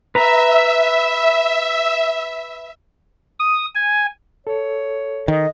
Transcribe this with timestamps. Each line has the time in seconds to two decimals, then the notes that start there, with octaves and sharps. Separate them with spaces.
0.15 B4 E5 A#5
3.39 D#6
3.75 G#5
4.47 A4 C#5
5.28 D#3 D#5